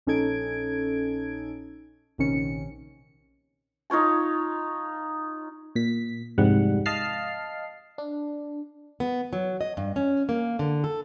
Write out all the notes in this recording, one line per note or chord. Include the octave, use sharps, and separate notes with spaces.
A#1 C#4 D#4 A4 G#6 D7
A#1 C3 D#3 C#4 C#7
D#4 F4 C#5 A5
A#2 B6
C2 F2 G#2 G3 F#5
D#5 F5 A5 F6 C7
D4
B3
F#3
D#5
G2
C#4
A#3
D3
A4